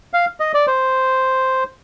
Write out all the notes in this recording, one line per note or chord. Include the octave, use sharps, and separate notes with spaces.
F5
D#5
D5
C5